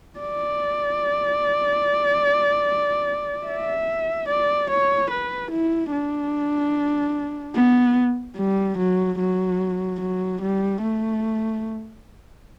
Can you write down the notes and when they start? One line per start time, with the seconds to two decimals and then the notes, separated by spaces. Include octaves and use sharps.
0.20 D5
3.47 E5
4.29 D5
4.70 C#5
5.11 B4
5.51 E4
5.91 D4
7.56 B3
8.37 G3
8.78 F#3
9.19 F#3
10.01 F#3
10.42 G3
10.83 A3